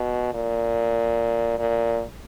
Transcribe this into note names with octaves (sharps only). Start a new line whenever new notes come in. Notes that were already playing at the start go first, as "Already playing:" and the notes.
Already playing: B2
A#2
A#2